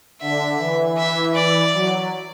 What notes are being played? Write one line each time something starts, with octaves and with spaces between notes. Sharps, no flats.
D3 E5
E3
E5
D5
F#3